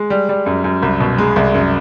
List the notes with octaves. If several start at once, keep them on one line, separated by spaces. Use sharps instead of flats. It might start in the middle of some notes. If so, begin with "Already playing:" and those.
Already playing: G#3
G3
G3
F#2
F#2
C2
B2
G#3
C2
F#2